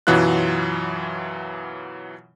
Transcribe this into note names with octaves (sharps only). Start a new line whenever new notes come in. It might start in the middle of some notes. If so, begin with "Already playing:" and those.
F#2 B2 E3 F#3 F4 F#6